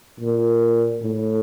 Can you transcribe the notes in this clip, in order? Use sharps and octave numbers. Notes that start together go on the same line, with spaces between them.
A#2
A2